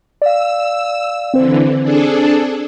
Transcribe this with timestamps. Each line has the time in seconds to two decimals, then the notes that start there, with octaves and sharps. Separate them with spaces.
0.22 D5 F5 E6
1.34 D3 E3 C4 C5
1.82 D4 G#4 A4